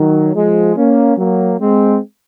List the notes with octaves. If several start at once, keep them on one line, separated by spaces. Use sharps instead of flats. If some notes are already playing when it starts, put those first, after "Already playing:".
Already playing: D#3 F#3
F3 G#3
A#3 C#4
F#3 A#3
G#3 C4